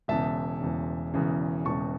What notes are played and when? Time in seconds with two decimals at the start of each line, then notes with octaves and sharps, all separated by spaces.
0.08 E1 E2 C#3 E5 A5
0.61 E1 E2 C#3
1.14 E1 E2 C#3
1.65 E1 E2 C#3 A5 C#6